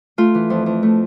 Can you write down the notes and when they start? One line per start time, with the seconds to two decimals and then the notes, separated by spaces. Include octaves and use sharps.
0.18 A3 F4
0.35 E3
0.50 F2
0.66 F2
0.83 A3